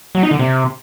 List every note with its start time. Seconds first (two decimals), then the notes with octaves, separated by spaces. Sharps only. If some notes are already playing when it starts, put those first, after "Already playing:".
0.15 F#3
0.23 D#4
0.31 D3
0.39 C3